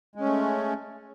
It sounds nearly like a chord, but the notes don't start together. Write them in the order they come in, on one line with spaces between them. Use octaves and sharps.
G#3 C#4 A3